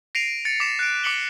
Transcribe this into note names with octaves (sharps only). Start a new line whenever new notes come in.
A#6 C7 D7 D#7 F7
A6 C#7
D6 B6 E7
F#6 D7
D6 B6 C#7 F#7 G7